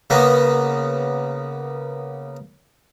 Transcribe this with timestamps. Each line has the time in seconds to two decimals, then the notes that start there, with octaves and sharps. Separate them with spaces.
0.10 C#3 A#3 B3